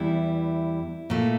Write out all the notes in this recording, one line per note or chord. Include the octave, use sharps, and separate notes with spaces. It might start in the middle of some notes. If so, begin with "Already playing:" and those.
Already playing: E2 E3 G3 E4
A#2 A3